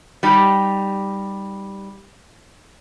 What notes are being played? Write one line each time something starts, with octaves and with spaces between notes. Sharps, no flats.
G3 D#4 G4